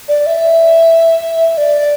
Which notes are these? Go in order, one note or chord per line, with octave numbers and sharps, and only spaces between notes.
D5
E5
D5